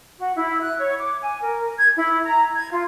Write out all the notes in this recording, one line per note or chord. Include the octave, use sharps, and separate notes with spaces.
F#4
E4
F#6
C#5
D6
G#5
A#4
G#6
E4
A#5
G#6
F4